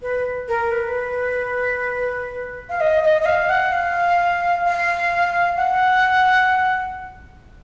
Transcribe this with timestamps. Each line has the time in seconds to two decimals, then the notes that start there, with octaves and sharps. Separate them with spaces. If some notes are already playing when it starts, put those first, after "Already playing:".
0.02 B4
0.48 A#4
0.71 B4
2.69 F5
2.80 D#5
3.03 D#5
3.21 D#5
3.25 F5
3.49 F#5
3.72 F5
4.65 F5
5.57 F#5